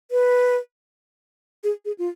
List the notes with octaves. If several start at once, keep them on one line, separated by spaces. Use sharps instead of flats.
B4
G#4
G#4
F4